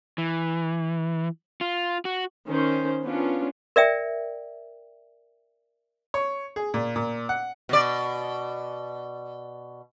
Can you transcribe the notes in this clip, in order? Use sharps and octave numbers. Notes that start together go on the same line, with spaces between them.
E3
F4
F#4
D#3 C#4 C5
B3 C#4 D4 F4
A#4 D5 E5 G5
C#5
G#4
A#2
A#2
F#5
B2 D5